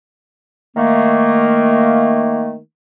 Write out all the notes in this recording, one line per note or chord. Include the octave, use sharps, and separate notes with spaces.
D#3 A3 A#3